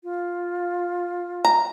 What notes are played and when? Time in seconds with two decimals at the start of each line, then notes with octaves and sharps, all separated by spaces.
0.04 F4
1.45 A#5